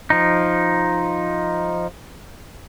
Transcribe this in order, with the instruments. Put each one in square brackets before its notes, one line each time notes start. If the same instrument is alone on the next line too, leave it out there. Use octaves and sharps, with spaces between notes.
[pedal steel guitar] F3 D#4